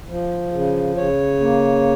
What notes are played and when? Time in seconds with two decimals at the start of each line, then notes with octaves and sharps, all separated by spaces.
0.08 F3
0.52 C#3
0.96 C#3 C#5
1.40 A#3